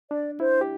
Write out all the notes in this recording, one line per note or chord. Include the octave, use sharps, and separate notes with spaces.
D4 D5
E4 C5
G4